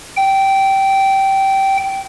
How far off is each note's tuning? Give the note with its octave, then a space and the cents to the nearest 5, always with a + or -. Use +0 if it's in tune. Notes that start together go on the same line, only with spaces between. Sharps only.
G5 -15